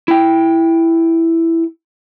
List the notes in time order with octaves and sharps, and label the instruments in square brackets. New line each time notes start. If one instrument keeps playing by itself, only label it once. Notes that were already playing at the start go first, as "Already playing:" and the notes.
[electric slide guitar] E4 G5